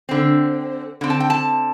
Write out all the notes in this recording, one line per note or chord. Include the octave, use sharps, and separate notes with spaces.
D3 C4
D3 C4
A5
G5
A5